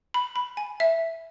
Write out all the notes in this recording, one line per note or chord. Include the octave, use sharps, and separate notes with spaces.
B5
B5
G#5
E5